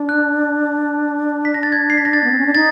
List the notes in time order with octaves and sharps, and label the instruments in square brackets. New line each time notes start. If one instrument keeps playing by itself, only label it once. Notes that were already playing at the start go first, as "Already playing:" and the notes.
Already playing: [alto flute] D4
[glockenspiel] F#6
B6
A#6
A6
G#6
C7
B6
A#6
A6
[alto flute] B3
C4
C#4
D4
[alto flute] D#4 [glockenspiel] A6